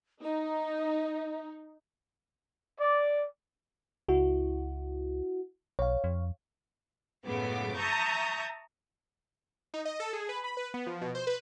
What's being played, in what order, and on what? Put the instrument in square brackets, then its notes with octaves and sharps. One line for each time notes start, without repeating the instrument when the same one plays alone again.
[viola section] D#4 [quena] D#5
[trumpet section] D5
[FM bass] C#2 [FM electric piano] E4 F#4
[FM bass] B1 [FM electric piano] C#5 F5
[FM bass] F2
[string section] C#2 F#2 A2 C#3 B3 D6
E5 A5 A#5 C#6 D#6 G6
[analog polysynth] D#4
D#5
A4
G#4
B4
B5
B4
B3
F3
B2
C5
B4